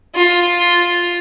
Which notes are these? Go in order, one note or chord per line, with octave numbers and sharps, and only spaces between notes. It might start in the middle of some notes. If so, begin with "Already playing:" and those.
F4